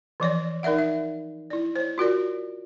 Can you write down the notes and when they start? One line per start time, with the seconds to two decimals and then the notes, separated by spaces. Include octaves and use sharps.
0.20 E3 F3 C#5 D5
0.63 D#4 A#4 D5 E5 F#5
0.79 E5
1.50 E4 D5
1.76 C5 C#5
1.98 F4 F#4 A#4 D5